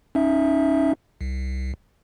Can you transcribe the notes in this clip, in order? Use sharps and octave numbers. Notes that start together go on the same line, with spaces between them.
C#4 D#4 E5
C2